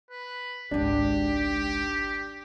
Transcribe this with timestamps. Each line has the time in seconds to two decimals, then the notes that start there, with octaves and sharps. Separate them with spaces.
0.11 B4
0.71 G#1 C#2 D4 G4